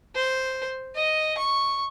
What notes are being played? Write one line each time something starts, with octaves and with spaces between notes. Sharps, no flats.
C5
D#5
C#6